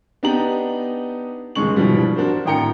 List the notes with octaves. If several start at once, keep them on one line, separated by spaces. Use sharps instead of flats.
B3 D4 D#4 G4 A#5 F#7
D#1 G#2 C#3 G#3 C#6 F#7
G2 B2 E3 F3 G3
D4 F#4 A#4 C5
G#1 A2 G5 A#5 C#7